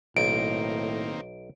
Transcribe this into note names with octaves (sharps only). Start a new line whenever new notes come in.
B1 A2 D#3 A#3 C4 D7